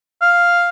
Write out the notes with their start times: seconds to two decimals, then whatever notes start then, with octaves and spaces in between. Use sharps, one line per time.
0.22 F5